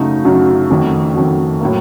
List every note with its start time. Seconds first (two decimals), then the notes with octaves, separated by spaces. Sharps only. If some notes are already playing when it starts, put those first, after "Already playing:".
Already playing: F#2 C#3 A3 D#4 F#4
0.25 F#2 C#3 A3 D#4 F#4
0.70 F2 D#3 A3 C#4 F#4
1.15 F2 D#3 A3 C#4 F#4
1.60 A2 F#3 A#3